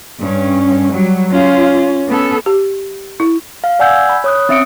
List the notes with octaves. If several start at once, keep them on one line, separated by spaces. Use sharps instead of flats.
G2 C#4
F#3 G3
C#4 F4
B3 C#4 A4
G4
E4
F5
D5 F#5 G#5 E6 G6 G#6
B5
C#5 D#6 F#6
C4 C#4 E5 D#6 C#7 D7